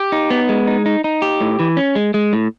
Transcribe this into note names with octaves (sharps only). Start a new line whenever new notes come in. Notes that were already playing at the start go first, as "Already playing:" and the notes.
Already playing: G4
D#4
B3
G#3
D#4
D#4
D#4
G4
A2
E3
C#4
G#3
G#3
A2